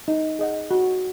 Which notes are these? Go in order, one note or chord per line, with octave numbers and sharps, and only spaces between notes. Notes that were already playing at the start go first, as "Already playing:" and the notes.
D#4
G#4 D#5 F#5
F#4